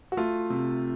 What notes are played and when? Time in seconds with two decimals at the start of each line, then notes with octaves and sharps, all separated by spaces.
0.12 F#4
0.17 A3 F4
0.50 C3